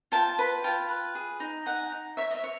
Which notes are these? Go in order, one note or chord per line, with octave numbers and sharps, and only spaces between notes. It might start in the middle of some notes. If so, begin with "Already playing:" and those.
F4 G5 A5
B4
F4 G5 A5
B4
G#4
D#4
D#4 F#5 G#5
D#4
C#5 E5
D#5
E5
C#5